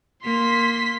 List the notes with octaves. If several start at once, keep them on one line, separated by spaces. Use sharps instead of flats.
A#3 C6 B6